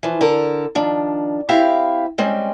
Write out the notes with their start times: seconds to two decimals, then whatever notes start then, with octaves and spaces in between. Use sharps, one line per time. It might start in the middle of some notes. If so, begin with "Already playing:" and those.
0.03 E3 F3
0.21 D3 A4 A#4
0.75 D#3 F3 D4
1.49 C4 E4 G4 E5 F5
2.18 G3 G#3 C4 C#4